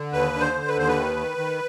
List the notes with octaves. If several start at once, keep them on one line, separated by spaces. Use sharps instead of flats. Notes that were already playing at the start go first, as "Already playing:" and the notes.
Already playing: D3
D#2 B4
D3
C5
D3
B4
D#2 C5
B4
D#3
D#3
D#3